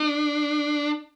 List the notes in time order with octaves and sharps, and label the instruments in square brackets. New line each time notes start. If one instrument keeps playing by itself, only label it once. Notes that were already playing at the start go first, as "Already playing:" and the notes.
Already playing: [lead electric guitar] D4